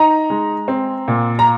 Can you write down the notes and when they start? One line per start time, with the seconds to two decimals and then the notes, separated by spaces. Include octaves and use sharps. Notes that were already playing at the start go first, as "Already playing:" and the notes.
Already playing: D#4 A#5
0.30 G#3
0.68 C4
1.08 A#2
1.39 A#5